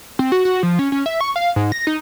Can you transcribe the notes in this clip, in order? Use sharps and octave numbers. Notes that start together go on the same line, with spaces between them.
C4
F#4
F#4
F3
C#4
C#4
E5
C#6
F5
G#2
A#6
D#4